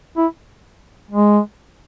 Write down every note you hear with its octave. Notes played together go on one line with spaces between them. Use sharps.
E4
G#3